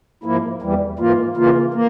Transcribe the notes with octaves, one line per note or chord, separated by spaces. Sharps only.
G#2 F3 A#3 E4
E2 E3 G3
G#2 E3 A#3 F4
C#3 E3 A#3 F4
A#3